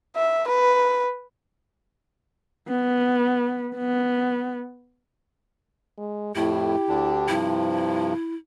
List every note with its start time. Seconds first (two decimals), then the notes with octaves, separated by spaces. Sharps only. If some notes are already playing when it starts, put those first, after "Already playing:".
0.16 E5
0.47 B4
2.68 B3
3.75 B3
5.97 G#3
6.36 F2 A2 A3 E4 G4
6.89 D2 D3 D4
7.29 G2 C3 F3 E4